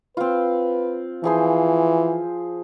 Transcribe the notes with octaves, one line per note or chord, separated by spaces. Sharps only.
C4 F4 B4
E3 F3 G#4 C5